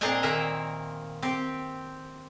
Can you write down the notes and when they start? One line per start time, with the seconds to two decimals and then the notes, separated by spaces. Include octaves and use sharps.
0.01 A#2 C4 D4 D#4 D#5 G#5
0.23 D#3 A#3 A#4 E5
1.23 C4 G4